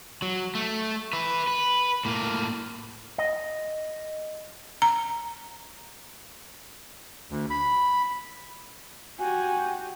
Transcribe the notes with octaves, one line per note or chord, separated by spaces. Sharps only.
F#3
A3
B4 E5
B4
A2 A#3
D#5
A#5
D2
B5
F#4 G4 G#5